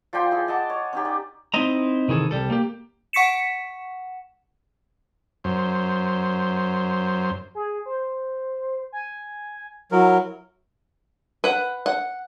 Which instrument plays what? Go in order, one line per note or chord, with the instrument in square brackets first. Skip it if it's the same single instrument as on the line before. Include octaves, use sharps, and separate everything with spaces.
[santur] F3 D5 G5 C6
E4 G#4
D#5 F#5 A5 D6
C#5
C#4 D#4 G4
D5
[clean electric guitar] C4 D#4 E4 C5 D#5 A#5
C3 D#3 E3 G#4 A4
C2 G3 A4
A#3 G4
[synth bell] F#5 C#6 B6 C#7 E7
[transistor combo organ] F#2 C5
[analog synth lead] G#4
C5
G#5
[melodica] F#3 A#4 [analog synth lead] E4
[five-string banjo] B4 F#5
F#5